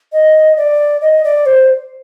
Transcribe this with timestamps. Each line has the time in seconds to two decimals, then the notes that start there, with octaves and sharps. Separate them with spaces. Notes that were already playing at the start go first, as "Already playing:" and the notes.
0.13 D#5
0.57 D5
1.01 D#5
1.24 D5
1.46 C5